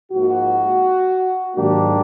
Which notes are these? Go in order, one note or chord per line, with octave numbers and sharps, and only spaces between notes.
G#2 F3 A#3 F#4
G#2 D#3 F#3 A#3 D4 G4